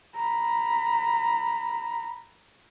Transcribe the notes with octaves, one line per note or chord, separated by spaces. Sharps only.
A#5 B5